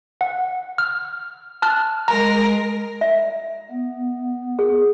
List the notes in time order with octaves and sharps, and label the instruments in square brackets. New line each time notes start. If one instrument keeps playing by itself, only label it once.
[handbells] F#5
F6
A5 F6 F#6
[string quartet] G#3 A#4 [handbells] A#5
[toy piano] E5
[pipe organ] B3
[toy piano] G#4